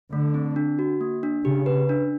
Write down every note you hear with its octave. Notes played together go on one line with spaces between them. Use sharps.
D3 A3
C4
D4
F#4
A#3
D4
C#3 G4
B4
D4